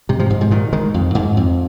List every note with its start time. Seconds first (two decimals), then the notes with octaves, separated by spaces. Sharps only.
0.09 G#2 C3
0.19 C3 F3
0.30 G#2
0.41 G#2 C3
0.51 A#2 D#3
0.73 D#3 G#3
0.94 F2
1.15 G#2
1.37 F2